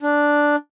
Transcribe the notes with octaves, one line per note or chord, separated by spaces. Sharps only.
D4